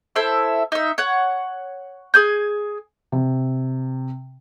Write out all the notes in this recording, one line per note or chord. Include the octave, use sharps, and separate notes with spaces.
E4 A4 C5 E5
D#4 E5
C#5 F#5
G#4 G#5 G6
C3